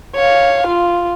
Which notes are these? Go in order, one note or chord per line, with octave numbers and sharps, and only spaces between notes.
C#5 F5
F4